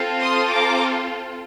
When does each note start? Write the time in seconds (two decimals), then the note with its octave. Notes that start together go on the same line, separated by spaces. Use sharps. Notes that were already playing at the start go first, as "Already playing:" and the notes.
Already playing: C4 F4 A4
0.20 C6 D#6
0.51 A#5 D6